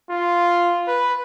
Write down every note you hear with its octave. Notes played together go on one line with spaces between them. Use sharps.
F4
B4